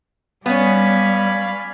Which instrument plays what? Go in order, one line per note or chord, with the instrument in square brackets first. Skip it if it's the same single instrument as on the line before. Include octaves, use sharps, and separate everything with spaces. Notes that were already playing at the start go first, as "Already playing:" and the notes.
[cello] G3 [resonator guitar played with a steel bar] B3 C#4 [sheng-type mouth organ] F5 G#5 B5